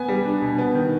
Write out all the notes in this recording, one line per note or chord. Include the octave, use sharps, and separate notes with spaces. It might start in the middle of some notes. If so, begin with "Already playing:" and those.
Already playing: B3 G#5
G3
D4
B2
B3
D#3